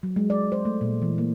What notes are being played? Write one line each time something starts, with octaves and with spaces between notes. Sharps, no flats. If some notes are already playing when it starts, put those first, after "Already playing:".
F#3
G#3
D5
C5
A3
A#2
E3
A#3